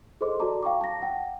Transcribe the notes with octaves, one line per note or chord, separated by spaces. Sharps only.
G#4 A4 C5 D#5 C6 D6
F#4 A4 D5 A5 A#5 D6
F5 G5 A#5 C#6 D6
A5 A#6
F#5 G5